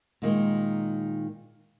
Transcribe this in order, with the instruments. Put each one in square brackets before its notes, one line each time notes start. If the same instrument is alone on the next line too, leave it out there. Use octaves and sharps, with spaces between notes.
[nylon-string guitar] A#2 D#3 G#3